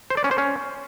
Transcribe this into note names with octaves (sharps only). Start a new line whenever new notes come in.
C5
D5
C#4
C5
C#4